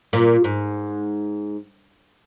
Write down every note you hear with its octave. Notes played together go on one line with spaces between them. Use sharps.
A#2
G#2